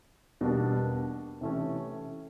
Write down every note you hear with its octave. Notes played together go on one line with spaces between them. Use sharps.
E2 B2 G3 A#3 D4
C3 E3 A3 C#4